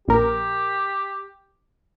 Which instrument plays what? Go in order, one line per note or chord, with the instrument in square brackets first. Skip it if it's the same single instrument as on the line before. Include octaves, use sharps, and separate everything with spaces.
[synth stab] A#1 A#4 [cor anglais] G4